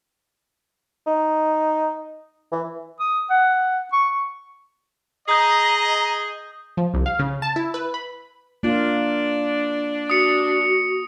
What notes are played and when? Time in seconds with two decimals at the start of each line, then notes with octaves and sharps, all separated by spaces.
1.07 D#4
2.52 E3
3.00 D#6
3.30 F#5
3.92 C#6
5.29 G#4 D#5 A#5 D#6 G6
6.77 F3
6.94 C2
7.06 F5
7.19 C#3
7.42 A5
7.56 E4
7.74 B4
7.94 B5
8.63 A#3 D4 F4
10.10 F#4 D#6 C#7